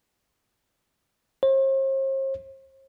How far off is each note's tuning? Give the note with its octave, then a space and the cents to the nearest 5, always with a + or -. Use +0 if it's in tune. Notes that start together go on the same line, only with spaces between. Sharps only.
C5 +45